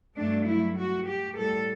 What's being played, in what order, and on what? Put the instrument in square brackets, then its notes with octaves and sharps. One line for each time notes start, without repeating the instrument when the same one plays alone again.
[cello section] G2 F#3 A3 D4
E4
F#4
G4
A2 G3 A4